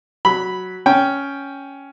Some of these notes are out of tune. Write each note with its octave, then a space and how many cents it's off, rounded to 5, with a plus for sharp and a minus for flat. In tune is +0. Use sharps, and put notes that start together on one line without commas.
F#3 +0 B5 -5
C#4 +5 G5 +0